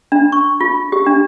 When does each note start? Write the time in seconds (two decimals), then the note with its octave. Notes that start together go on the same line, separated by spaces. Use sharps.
0.12 D4
0.32 C#6
0.60 F4
0.92 G4
1.06 D4